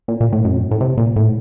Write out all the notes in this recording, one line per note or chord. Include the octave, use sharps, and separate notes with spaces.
A#2
A#2
A2
F#2
F2
F#2
A2
C3
A#2
A2